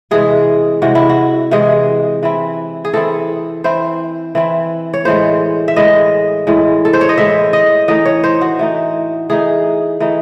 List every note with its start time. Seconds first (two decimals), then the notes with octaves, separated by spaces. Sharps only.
0.11 C3 E3 G#3 G#4
0.82 C3 E3 G#3 F#4
0.95 E4
1.09 F#4
1.51 C3 E3 G#3 G#4
2.23 E3 C4 E4
2.85 G#4
2.94 E3 C4 E4 A4
3.64 E3 C4 E4 C5
4.35 E3 C4 E4
4.94 C#5
5.05 A2 E3 G#3 C5
5.68 E5
5.76 A2 E3 G#3 D#5
6.47 A2 E3 G#3
6.85 A4
6.93 C5
7.01 C#5
7.09 D#5
7.17 A2 E3 G#3 E5
7.53 D#5
7.88 E3 A3 D#4 D#5
8.05 C#5
8.24 C5
8.41 F#4
8.59 E3 A3 D#4
9.30 E3 A3 D#4 G#4
10.00 E3 A3 D#4